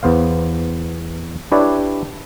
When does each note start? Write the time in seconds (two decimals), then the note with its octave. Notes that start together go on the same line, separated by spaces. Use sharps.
0.03 E2 B3 C5 F5
1.52 D4 E4 G4 B4 C#5 D5